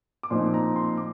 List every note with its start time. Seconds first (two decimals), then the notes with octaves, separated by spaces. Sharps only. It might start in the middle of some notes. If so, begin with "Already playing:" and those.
0.23 D6
0.30 A#2 F3 C4 D#4 C6
0.54 A#5
0.76 C6
0.97 D6